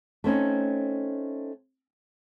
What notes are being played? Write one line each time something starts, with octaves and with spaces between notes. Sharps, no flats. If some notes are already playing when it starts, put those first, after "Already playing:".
A3 C4 C#4 D#4